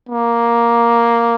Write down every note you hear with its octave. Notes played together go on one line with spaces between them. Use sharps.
A#3